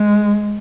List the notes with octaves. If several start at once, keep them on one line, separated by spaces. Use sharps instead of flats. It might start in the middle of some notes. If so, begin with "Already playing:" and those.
Already playing: G#3